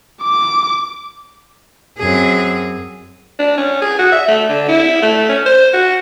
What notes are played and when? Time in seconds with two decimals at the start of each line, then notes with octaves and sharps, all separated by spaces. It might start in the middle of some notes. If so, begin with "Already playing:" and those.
0.23 D6
1.98 F#2 C4 G#4
3.39 D4
3.57 C#4
3.81 G#4
3.98 F#4
4.12 E5
4.28 A3
4.49 D3
4.68 E4
5.02 A3
5.29 C#4
5.46 C5
5.73 F#4